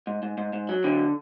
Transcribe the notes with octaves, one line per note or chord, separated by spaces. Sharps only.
G#2
G#2
G#2
G#2
F#3
D3